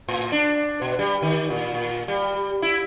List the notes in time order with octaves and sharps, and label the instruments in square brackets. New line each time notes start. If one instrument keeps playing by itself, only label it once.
[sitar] A2
D4
B2
G3
D#3
A#2
A#2
G3
E4